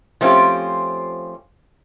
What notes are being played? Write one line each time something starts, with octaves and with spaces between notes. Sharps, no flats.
F3 A3 C4 C#4 F4 G4